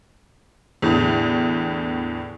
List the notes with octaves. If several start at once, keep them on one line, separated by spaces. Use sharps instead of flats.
E2 A2 D3